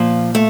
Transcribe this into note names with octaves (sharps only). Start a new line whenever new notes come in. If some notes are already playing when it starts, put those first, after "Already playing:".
Already playing: A#2 F3
A3